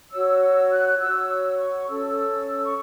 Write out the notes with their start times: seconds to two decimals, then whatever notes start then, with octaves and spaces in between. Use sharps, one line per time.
0.11 F#4 C#5 E6
0.41 E6
0.70 F#6
0.99 F#4 C#5 E6
1.29 E6
1.57 C#6
1.87 C#4 A4 C#5 E6
2.63 C#6